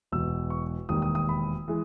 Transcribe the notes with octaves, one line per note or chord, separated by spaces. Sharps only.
E1 E2 B2 E6
C#6
E1 D#2 D#3 G3 D#6
D#6
D#6
B5
E3 G#3